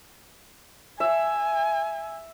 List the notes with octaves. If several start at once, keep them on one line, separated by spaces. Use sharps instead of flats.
E5 G#5